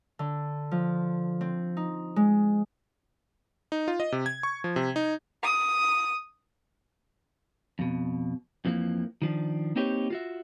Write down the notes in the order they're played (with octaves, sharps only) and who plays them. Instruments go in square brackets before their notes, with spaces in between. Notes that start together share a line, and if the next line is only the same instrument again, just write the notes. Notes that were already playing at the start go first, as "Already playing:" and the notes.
[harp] D3
F3
C4
D#4
G#3
[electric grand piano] D#4
F4
D#5
C3
G#6
C#6
F3
C3
D#4
[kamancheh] D#6
[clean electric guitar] F2 B2
F2 E3 F3 A3 A#3
D#3 F3 D4
A#3 C4 D#4 G4 B4 C#5
F4 F#4 E5